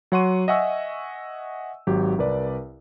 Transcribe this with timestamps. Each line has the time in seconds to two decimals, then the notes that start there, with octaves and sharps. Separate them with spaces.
0.12 F#3 C#5 F#5 C6 C#6 D#7
0.48 D#5 E5 F#5 G#5 C#6 E6
1.87 G#1 F#3 G4
2.18 C2 A#4 B4 D5